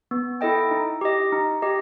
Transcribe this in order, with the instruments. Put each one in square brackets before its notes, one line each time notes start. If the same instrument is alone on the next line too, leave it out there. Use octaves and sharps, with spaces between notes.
[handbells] B3
E4 A4 D#5 G5
D#4
G4 D#5
D#4
G4 D#5